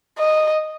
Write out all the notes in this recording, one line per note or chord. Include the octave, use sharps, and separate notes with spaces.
D#5